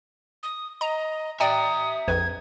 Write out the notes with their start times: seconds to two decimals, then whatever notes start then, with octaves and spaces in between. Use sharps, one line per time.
0.43 D#6
0.81 D#5 A#5
1.40 D5 E5 G5 A#5 D#6
2.08 A#1 F2 B4 G#6